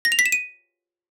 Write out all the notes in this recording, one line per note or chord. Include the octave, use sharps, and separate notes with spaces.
A#6
F7
B6
E7
D#7